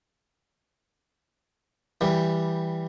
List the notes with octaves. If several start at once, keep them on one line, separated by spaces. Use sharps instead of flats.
E3 G3